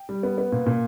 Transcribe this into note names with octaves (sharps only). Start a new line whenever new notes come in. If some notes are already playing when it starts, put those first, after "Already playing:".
Already playing: G5
G3
B3
B3
A#2
A#2